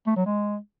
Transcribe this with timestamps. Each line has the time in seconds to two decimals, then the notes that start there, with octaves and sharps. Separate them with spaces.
0.07 A3
0.17 F#3
0.26 G#3